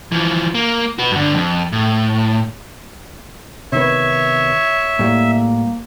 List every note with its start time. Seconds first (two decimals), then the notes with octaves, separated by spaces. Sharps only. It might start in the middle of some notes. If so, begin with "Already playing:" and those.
0.12 E3 F3
0.55 A#3
0.99 F#4 B4
1.11 G2 D3
1.35 F2
1.73 A2
3.72 C3 D#3 B3 C#5 E5
4.99 A2 G3 A#3